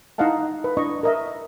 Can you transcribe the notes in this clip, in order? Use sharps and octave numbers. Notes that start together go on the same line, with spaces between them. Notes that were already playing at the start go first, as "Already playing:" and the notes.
D#4 E4 D#5 F5 F#5 A5
B4
D4 E4 D#5 C#6
A#4 D#5 E5